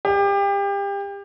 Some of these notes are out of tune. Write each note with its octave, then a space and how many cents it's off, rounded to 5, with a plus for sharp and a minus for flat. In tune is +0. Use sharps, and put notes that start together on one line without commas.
G4 +30